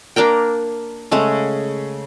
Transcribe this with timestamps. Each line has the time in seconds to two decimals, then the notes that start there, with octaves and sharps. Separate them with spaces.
0.16 A#3 D4 A#4 G5
1.12 C#3 G#3 A3